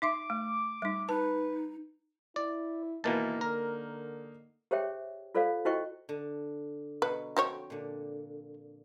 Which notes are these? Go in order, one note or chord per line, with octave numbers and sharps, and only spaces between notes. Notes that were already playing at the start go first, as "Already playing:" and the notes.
D#4 E5 C6 D6
A3
G3 D#4
D#4 B4 A5
E4 D5
B2 D#3 E3 A#3 D#4 A5
D3 A#4
G4 G#4 C5 C#5 E5 G5
F4 A4 C5 D5 F5
E4 F#4 C5 D#5 G5 C#6
D3
B2 F#3 B4
F2 F#4 C5 C#5 G5
A#2 D3